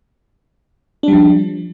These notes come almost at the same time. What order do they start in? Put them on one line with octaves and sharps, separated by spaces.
D4 G3 F3